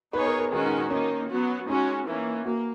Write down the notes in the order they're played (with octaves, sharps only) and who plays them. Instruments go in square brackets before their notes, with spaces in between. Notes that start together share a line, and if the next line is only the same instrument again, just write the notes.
[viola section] B3 D#4 G#4 C#5 [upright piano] B4
[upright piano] A#4
A#4
[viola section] D#3 G#3 C#4 F#4 [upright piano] G#4
[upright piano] D#4
D#4
[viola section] D#3 A#3 D#4 [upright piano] C#4
[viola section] F#3 B3 F#4
[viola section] G#3 C#4 F#4 [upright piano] D#4
[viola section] E3 A#3 C#4
[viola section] A#3 [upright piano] F#4